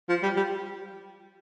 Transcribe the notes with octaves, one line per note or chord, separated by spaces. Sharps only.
F3
G3
G3